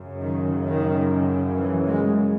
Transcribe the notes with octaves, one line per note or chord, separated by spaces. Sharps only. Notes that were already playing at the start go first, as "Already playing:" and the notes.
Already playing: F#2 C#3
D#3
D#3
E3
G#3